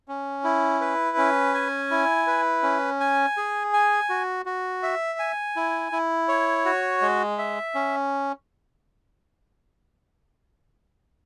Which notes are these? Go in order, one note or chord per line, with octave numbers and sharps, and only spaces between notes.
C#4
E4
B4
C#4
G#5
E4
B4
C#4
G#5
G#4
G#5
F#4
F#4
E5
G#5
E4
E4
C#5
F#4
G#3
E5
C#4